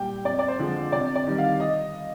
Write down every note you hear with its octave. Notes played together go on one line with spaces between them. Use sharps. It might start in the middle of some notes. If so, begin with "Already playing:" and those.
Already playing: A#2 G3 G5
F2 D5
D5
C5
D3 F3 G#3
C3 D5
D5
D#3 G3
F5
D#5